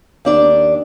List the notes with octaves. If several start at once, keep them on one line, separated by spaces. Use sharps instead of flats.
D#2 D4 D5